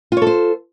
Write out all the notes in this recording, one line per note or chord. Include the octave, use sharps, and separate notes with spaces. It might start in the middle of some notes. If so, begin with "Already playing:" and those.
F4 A4 C5 C#5